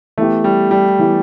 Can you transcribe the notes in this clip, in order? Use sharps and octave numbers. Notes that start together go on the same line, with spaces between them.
E3 A3 B3 E4 G4
G3
G3
E3 B3 E4 G4